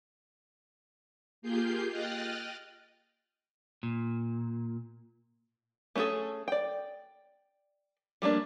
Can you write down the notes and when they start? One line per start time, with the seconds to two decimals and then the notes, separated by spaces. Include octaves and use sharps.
1.42 A#3 F4 G4 G#4 G6 C7
1.90 D#5 G5 D#6 F6 F#6 A6
3.83 A#2
5.96 A3 C#4 F4 G#4 A4
6.48 D5 G5
8.22 G3 A3 A#3 D4